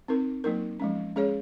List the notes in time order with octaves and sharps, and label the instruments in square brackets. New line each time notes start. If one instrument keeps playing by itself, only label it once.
[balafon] C4 D#4 A#4
F#3 A#3 D#4 A#4
F3 G#3 C#4
G#3 C#4 G#4 C#5